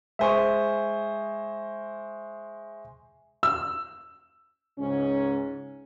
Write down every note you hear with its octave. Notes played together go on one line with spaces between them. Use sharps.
G#3 C5 E5 G#5 C#6
E6
C#2 G#2 C#4